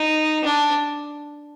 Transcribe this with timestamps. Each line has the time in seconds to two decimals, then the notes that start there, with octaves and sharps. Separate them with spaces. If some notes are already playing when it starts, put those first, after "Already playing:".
Already playing: D#4
0.44 D4